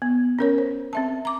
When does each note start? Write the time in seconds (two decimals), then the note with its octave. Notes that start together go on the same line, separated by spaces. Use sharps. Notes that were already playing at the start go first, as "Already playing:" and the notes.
0.02 B3
0.39 C#4 A#4 C#5
0.58 C5
0.93 C4 E5 A5
1.25 A#5 D6